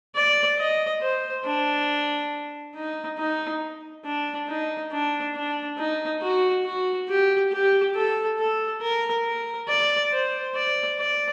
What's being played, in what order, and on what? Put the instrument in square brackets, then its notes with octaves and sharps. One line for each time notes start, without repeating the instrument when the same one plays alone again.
[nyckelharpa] D5
D#5
C5
D4
D#4
D#4
D4
D#4
D4
D4
D#4
F#4
F#4
G4
G4
A4
A4
A#4
A#4
D5
C5
D5
D5